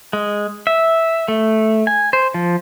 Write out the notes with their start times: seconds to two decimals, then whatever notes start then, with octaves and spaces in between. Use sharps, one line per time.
0.13 G#3
0.67 E5
1.28 A3
1.87 G#5
2.13 C5
2.34 F3